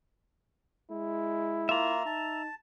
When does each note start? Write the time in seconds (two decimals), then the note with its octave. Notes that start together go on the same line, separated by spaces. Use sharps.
0.91 G#3 E4
1.69 A#3 F4 E5 A#5
2.06 D#4 A5